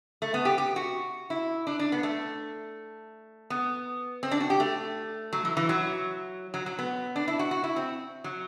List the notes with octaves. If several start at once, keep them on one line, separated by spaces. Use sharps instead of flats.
A3
B3
G4
G4
F#4
E4
D4
D4
B3
A3
B3
C4
D4
F#4
G4
A3
F#3
E3
E3
F#3
F#3
F#3
B3
D4
E4
F#4
F#4
E4
C4
F#3